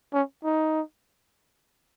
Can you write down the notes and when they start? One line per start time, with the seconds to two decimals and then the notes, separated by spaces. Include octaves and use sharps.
0.13 C#4
0.44 D#4